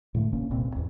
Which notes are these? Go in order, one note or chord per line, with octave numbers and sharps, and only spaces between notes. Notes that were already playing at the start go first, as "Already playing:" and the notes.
A2 D3 A3
G1 C2 A#3 C#4
E1 C2 A#2 C4
E2 G#2